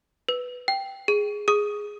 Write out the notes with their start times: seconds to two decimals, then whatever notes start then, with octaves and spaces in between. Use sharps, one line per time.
0.29 B4
0.68 G5
1.08 G#4
1.48 G#4 D#6